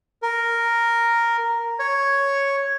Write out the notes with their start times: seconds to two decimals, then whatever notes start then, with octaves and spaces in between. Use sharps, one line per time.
0.22 A#4
1.79 C#5